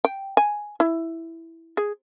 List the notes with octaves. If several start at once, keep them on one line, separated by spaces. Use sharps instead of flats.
G5
G#5
E4
G#4